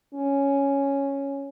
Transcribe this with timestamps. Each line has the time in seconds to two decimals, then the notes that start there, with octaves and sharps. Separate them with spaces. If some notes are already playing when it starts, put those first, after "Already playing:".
0.14 C#4